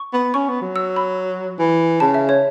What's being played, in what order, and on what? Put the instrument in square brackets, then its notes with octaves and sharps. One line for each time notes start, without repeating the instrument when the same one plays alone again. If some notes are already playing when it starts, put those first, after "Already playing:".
Already playing: [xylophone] C#6
[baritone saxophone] B3
[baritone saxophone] C#4 [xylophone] C#6
[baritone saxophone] B3
F#3
[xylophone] E6
B5
[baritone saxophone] E3
[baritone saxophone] C#3 [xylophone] A5
[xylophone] E5
C#5